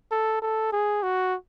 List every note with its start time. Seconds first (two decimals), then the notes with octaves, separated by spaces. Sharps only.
0.11 A4
0.42 A4
0.72 G#4
1.03 F#4